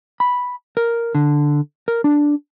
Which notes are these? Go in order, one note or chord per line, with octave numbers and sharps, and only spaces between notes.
B5
A#4
D3
A#4
D4